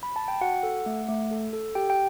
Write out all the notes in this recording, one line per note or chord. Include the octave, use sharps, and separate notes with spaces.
B5
A5
G5
F#4 F#5
A4
A3
A3
A4
A4
G4 G5
G5